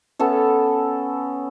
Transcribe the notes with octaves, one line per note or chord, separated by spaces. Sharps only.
B3 C#4 A4